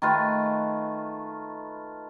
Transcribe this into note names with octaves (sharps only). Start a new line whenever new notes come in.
D#3 A3 F4 B4